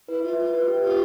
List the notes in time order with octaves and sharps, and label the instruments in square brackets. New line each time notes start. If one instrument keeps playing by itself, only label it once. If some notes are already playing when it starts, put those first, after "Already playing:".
[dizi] E4 [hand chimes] B4
[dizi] F4 [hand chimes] E5
[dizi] F4 [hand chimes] B4
[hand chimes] B4
G4
[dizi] F4 [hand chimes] G4